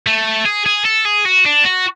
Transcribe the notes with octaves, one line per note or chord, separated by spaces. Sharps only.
A3
G#4
G#4
A4
G#4
F#4
D4
F#4